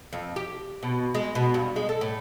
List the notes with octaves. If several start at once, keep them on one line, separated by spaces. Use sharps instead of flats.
F2
G4
B2
G#3
B2
G2
G#3
A4
A2